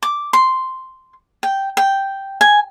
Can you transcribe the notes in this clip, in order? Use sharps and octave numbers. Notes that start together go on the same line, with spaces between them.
D6
C6
G5
G5
G#5